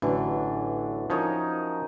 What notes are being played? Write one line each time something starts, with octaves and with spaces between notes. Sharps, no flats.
A1 D3 E3 F#3 D4
F3 C#4 D#4 A#4 C#5